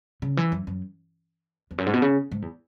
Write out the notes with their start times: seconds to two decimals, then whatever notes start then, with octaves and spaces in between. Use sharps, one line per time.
0.22 C#3
0.37 E3
0.52 F#2
0.67 F#2
1.71 E2
1.78 F#2
1.86 G#2
1.93 B2
2.02 C#3
2.32 G#2
2.42 E2